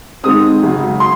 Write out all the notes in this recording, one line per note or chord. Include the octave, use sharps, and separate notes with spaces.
G#2 D#3 G#3 C4 D#6
G#1 F#2 C#3
C6